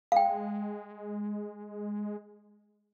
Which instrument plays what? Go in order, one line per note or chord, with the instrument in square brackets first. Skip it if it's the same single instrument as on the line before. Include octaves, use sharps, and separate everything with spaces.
[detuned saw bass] G#3 [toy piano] F5 G5